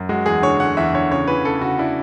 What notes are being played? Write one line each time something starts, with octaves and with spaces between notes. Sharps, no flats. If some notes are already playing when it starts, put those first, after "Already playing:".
Already playing: F#2
G#3 F#4
E2 G#4
D3 C#5
D3 F#5
E2 E5
D3 C#5
C#3 C#5
E3 B4
C#3 A4
C#3 F#4
D4 E4